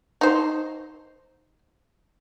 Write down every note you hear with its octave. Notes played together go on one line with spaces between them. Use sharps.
D#4 C5